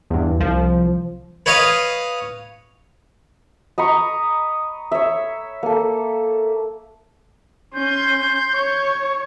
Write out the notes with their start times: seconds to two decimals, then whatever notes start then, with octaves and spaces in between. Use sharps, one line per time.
0.10 E2 G2
0.40 C2 F3
1.46 B4 C#5 D#5 F5
3.78 D#5 A#5 B5 C#6
4.92 C#5 E5
5.63 A#3 A4
7.74 C#4 C6 G6
8.54 C#5 C#6